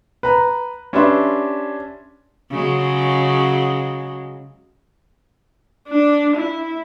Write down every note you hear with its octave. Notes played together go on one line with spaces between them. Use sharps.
B4 A#5
C#4 D4 G4 B4 E5 C6
C#3 F#3 G#3
D4
E4